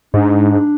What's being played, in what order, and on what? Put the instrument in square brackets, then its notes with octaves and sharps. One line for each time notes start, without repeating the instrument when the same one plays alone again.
[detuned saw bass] G#2 [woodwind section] D4